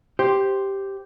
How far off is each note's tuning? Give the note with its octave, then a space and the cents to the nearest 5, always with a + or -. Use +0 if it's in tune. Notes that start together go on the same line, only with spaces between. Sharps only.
G4 +0 C5 +0